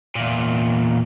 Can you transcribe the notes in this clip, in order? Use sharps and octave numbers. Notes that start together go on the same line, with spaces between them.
E2 A#2